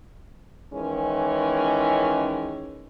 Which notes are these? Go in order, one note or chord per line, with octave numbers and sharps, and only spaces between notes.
D#3 E3 G#3 C#4